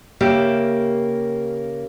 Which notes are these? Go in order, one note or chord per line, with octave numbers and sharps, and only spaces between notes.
C#3 A#3 G4 E5